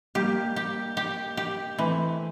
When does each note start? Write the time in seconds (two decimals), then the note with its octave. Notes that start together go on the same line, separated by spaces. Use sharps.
0.15 G3 A#3 G4
0.56 G4
0.97 G4
1.37 G4
1.78 E3 A3 C4